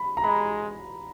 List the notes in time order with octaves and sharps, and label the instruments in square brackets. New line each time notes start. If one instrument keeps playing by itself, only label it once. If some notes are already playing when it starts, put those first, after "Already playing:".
Already playing: [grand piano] B5
A#5
[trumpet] G#3 [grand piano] B5